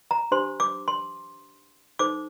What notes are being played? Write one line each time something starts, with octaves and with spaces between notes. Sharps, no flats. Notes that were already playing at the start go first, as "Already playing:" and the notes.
A#5
D4 G4 C5 C6
D6
C6
D#4 A4 C5 D6